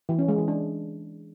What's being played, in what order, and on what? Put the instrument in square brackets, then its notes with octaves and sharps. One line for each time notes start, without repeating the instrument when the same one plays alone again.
[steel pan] E3
C#4
G#3
E3
D4